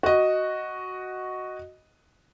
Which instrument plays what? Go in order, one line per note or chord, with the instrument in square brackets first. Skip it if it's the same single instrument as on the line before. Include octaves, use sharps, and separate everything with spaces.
[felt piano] F#4 D#5